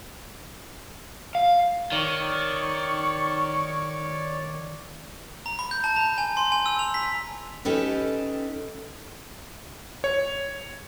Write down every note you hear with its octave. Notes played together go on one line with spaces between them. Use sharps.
F5
D#3 C#5 D5 C#6
A#5
B5
G6
A5
A#5
G#5
C6
G#5
E6
F7
B6
C#4 D#4 G4 A4 B4
C#5